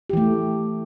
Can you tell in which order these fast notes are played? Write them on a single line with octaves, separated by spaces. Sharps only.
G4 E3 A3